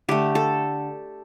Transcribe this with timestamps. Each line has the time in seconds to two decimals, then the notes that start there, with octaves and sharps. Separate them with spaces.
0.09 D3 A3 G4
0.35 A4